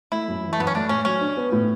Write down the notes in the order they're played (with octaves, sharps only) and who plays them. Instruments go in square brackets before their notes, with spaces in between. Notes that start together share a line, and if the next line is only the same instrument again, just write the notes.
[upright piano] A3 [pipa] E4
[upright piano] F#2
E3
[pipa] A3
[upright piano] F#2 [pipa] B3
[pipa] C#4
[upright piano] A3 [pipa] D4
[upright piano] A2 [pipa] C#4
[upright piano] F#3 [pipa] C#4
[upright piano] D4
B3
A2